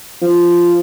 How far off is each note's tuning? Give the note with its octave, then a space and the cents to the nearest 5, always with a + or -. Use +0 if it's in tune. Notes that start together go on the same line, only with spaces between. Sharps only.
F3 -10